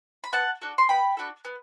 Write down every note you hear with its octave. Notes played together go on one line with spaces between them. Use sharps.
B5
B3 F#5 A5
D4 F#4 A4
C6
B3 G5 B5
D4 F#4 A4
B3